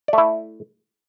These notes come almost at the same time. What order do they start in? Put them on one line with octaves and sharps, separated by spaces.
D5 A3 E4